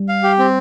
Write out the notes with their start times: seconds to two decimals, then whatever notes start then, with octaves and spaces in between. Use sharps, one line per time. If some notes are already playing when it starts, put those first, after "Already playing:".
Already playing: G3
0.09 F5
0.23 G4
0.39 C4